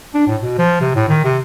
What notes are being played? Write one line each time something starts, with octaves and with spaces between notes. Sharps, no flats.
D4
A2
B2
F3
C3
A2
D#3
C3